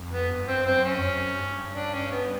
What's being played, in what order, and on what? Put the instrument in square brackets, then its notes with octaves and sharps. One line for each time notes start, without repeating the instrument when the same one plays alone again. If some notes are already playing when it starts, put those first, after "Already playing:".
Already playing: [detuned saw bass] F2
[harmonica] B3
[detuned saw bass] G2
[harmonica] C4
[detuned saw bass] F#2 [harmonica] C4
[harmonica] C#4
[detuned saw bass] F2
F#2
G2
[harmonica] D4
C#4
B3